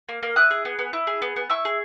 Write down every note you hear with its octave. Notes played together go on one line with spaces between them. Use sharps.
A#3
A#3
E4 D#6 F#6
G#4
B3
B3
E4
G#4
B3
B3
E4 C#6 E6
G#4